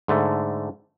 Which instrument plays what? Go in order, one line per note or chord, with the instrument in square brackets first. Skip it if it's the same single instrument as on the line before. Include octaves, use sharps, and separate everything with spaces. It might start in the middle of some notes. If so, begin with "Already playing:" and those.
[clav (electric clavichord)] G#2 D3 A3